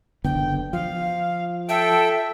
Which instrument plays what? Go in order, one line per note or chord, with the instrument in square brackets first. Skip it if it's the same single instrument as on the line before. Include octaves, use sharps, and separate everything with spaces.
[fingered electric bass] F#1 D3 B3 [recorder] G5
[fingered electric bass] F3 [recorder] F5
[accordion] A4 G5 [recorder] E5